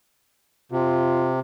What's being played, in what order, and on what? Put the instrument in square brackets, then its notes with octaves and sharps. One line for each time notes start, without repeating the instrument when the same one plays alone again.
[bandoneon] C3 [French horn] F4